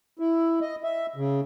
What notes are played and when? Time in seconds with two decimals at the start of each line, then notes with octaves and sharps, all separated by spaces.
0.19 E4
0.61 D#5
0.84 E5
1.16 C#3